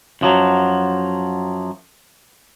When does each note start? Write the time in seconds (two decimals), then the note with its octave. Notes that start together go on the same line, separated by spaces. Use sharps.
0.21 F#2 F3 F#3